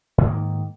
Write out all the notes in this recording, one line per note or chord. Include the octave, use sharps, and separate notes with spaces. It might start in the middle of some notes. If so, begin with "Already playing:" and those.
G#2 D#3 A#3